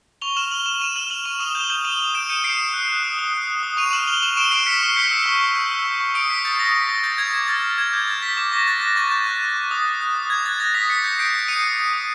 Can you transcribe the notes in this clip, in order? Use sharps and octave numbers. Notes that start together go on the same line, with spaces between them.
C#6 F7 G7
F6 E7 F#7
F6 E7 F#7
C#6 E7 F#7
C#6 D#7 F7
F6 E7 F#7
F6 E7 F#7
C#6 D#7 F7
D#6 E7 F#7
G6 F7 G7
G6 E7 F#7
D#6 D#7 F7
D#6
G6 D7 E7
G6 C#7 D#7
D#6 C7 D7
D#6
F#6
F#6
D#6
D#6
F#6
F#6
D#6
C#6 D#7 F7
F6 E7 F#7
F6 F7 G7
C#6 E7 F#7
C#6 D7 E7
F6 C7 D7
F6 B6 C#7
C#6
G6 B6 C#7
E6
C#6
C#6
G6
E6
C#6
C#6
D#6 C7 D7
G6 B6 C#7
G6 A6
D#6 A#6
D#6 B6
G6 A#6
G6 A6
D#6 G#6
D6 G#6
F6 A6
F6
D6 G#6
D6 G6
F6 A6
F6 B6
D6
C#6 A#6
F#6 A6
F#6 A#6
C#6 A6
C#6 G6
F#6
F#6
C#6
D#6
F#6
F#6
D#6
D#6 G#6
F#6 A6
F#6 A#6
D#6 B6
D#6 B6 C#7
G6
G6 C7 D7
D#6
D#6 C#7 D#7
G6
G6
D#6